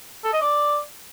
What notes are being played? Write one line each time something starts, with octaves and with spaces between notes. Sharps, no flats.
A4
D#5
D5